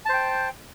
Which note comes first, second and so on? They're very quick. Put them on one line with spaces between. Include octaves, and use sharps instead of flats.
A5 C5 G5